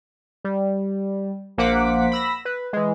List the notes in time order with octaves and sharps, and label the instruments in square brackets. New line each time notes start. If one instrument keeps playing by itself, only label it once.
[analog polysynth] G3
A#1 A#3 C5 F#5 D6 B6
B5 E6 A#6
B4
E3 G#3